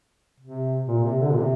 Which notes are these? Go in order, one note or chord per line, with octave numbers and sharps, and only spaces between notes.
C3
A#2
C3
D3
A#2
C3